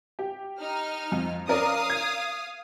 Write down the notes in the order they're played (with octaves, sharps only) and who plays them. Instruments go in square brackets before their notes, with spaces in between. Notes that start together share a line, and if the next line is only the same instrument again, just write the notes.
[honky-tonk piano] G4
[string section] D#4 F6
[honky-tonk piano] F2
[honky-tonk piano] C#4 A#4 D5 [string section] F5 D#6
[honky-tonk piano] G#6